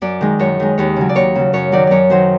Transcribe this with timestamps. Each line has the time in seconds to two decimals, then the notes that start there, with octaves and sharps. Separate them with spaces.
0.02 F#2 D5
0.21 D#3 G#3
0.39 F#2 C#5
0.60 D#3 G#3
0.78 D#2 C#5
0.96 C#3 F#3
1.09 D5
1.15 D#2 C#5
1.35 C#3 F#3
1.53 F#2 C#5
1.72 D#3 F#3 D5
1.87 F#2 C#5 D5
2.10 D#3 F#3 C5